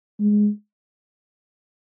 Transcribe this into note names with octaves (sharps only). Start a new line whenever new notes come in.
G#3